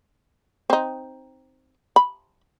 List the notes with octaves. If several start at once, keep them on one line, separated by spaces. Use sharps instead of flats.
C4 D#4
B5